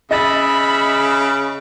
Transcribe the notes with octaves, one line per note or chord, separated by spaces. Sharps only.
C#3 D#5 E5 B5 A6